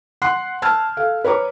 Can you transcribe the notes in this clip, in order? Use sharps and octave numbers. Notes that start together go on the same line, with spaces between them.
F#5 C6 F#6 C7
A5 E6 F6 G#6
A4 F5
B4 C#5 A#5 D6